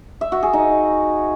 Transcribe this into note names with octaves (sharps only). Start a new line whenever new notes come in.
E5
F#4
G#4
D#4